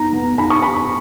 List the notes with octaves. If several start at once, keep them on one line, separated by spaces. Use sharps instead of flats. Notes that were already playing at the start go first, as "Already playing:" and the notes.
Already playing: B3 D#4 A#5
B3
D#4 B5
C#6
D#4 B5